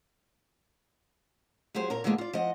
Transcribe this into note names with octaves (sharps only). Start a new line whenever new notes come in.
F3 F#3 G4 G#4 C5
A#2 A#4 C#5 A#5
D3 D#3 F3 G#3 A#3 B3
F4 D5
F3 D#5 F#5